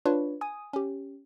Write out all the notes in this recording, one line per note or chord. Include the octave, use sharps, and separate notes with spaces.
D4 F4 B4 C#5
G#5 D#6 D#7
C#4 G4